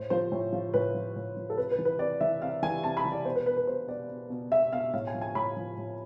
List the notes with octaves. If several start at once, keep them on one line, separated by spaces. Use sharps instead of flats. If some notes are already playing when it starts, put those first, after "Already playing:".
Already playing: A2 C5
F3 C5
A2
F3
A2 B4
F3
A2
F3
A4
C3 B4
B4
E3
B4
C3 D5
E3 E5
C3 F5
E3 G#5
C3 A5
B5
E3
D5
B2 C5
B4
B2 B4
B4
B2 C5
B2 D5
B2
B2
B2 E5
B2 F5
A2 F5
G#5
F3
G#5
A2 B5
F3
A2